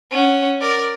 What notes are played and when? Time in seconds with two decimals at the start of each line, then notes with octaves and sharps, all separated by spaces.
0.11 C#4 F#5
0.61 A#4 D5